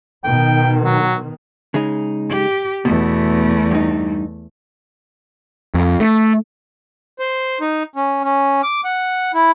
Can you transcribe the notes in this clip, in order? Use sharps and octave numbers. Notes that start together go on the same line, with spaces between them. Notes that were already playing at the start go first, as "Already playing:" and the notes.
B2 D#3 G5
F#3
C#3 G#3 D#4
G4
E2 B2 A3
G2 D#4
F2
A3
C5
D#4
C#4
C#4
D6
F#5
E4